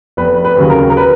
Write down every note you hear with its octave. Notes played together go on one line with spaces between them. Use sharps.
F1 B4
B4
D#2 C#3 F#3
A#4
A#4
B4